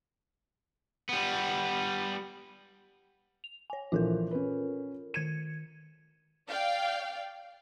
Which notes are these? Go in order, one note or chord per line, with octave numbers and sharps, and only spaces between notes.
G3 B3
F7
C#5 G#5
A#1 E3 F3 F4 A4 A#4
C#4 B4
D#3 G#6 C#7 D#7
D5 F5 G5